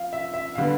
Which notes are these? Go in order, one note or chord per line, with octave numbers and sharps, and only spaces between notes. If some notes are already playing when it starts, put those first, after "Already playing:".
Already playing: F3 F5
E5
E5
F5
D3 G3 B3